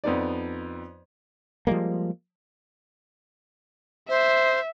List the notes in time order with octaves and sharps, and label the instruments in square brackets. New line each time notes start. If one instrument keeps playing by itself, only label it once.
[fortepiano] F2 B3 D#4 D5
[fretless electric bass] F3 G3 G#3 A#3
[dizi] C5 [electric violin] E5